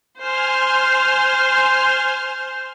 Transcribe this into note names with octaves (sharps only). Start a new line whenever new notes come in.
C5 G#5 C6 F6